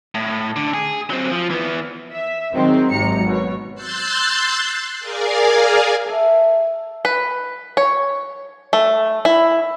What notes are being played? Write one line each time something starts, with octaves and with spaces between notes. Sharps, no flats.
A2
D3
G#4
F#3 C4
F3
E3 B3
E5
D#3 F#3 G#3 C4 D#4
G#1 C3 F#3 A#5 C#7
B2 C#5
C6 E6 F#6 G6 A6 C7
G#4 A#4 D5 F5 G#5
A4 E5
B4
C#5
A3
E4